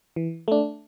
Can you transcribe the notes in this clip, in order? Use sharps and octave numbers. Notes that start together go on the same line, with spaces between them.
E3
A3 D4